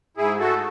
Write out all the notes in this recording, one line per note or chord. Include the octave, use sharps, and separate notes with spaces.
G#2 E4 G#4
A3 F#4 A4